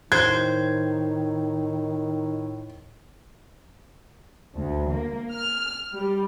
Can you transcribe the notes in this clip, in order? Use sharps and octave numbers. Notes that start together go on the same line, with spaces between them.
A2 D#3 C5 G#6
D2
A#3
F6
G3